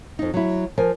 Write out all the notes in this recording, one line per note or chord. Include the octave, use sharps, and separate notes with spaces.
F2 D#4
F#3 E4
F3 A#4 G#5